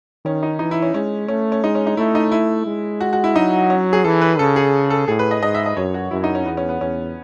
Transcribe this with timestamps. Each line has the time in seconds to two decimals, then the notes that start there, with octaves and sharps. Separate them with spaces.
0.25 D#3 C#4
0.43 D#4
0.59 E3 D#4
0.71 E4
0.82 C#4
0.94 G#3 C#4
1.28 A3 C#4
1.52 C#4
1.63 G#3 D#4
1.75 C#4
1.87 D#4
1.97 A3 E4
2.15 D#4
2.32 E4
2.66 G#3
3.01 F#4
3.13 F#4
3.24 E4
3.35 F#3 D#4
3.70 C#4
3.93 G#4
4.04 E3 A4
4.21 B4
4.39 C#3 A4
4.56 G#4
4.90 A4
5.08 A2 G#4
5.19 B4
5.31 D#5
5.42 G#2 D#5
5.55 E5
5.66 D#5
5.77 F#2 C#5
5.94 F#4
6.11 F#2 E4
6.24 D#4
6.35 C#4
6.46 E2 B3
6.57 C#4
6.69 B3
6.81 E2 C#4